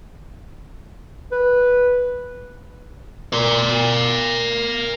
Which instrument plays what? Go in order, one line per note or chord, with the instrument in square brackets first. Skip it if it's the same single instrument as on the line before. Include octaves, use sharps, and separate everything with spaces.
[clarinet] B4
[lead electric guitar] A#4 D5